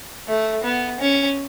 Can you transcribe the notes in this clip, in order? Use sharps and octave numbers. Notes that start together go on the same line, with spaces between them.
A3
B3
C#4